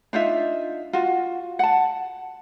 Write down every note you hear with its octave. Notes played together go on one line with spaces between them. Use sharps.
D4 D#4 F4 E5
F4 F#4
F#5 A5